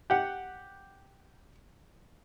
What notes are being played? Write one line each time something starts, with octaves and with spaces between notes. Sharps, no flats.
G4 F#5